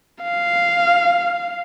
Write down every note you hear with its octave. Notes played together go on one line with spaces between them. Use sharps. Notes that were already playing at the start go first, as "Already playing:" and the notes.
F5